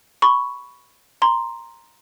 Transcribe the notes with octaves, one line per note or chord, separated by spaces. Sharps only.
B5 C#6
A#5 C6